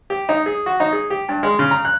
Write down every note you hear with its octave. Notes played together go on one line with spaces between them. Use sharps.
G4
D#4
G#4
F#4
D#4
G#4
G4
G2
G#3
C#3
A#5
F#6